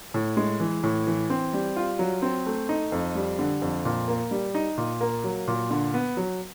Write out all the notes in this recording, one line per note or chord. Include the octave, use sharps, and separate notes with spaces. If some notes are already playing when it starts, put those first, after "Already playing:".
A2
G#3
E3
A2
E3
C4
G3
F4
F#3
C4
A3
D#4
F2
G3
D3
F2
A#2
A#3
G3
D#4
A#2
A#3
F#3
A#2
D3
B3
F#3